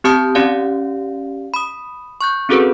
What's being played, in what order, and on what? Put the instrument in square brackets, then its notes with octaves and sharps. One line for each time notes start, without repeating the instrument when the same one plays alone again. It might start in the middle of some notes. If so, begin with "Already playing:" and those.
[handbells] C4 G4 A5 D#6 G6
C#4 G4 D5 F5
B5 D#6
C#6 F#6 G6
C4 C#4 F#4 G#4 A4 B4